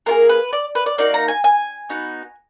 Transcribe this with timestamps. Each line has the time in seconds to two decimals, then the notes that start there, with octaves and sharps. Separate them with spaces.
0.06 A#3 F4 G#4 A#4
0.29 B4
0.53 D5
0.75 B4
0.86 D5
0.98 A#3 D#4 F#4 D5
1.14 A#5
1.28 G#5
1.44 G#5
1.89 B3 D#4 F#4